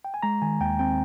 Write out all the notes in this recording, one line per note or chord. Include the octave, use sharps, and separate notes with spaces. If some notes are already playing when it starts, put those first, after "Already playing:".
G5
G#5
G#3 A#5
D#3 G#5
D#2 G5
C4 G5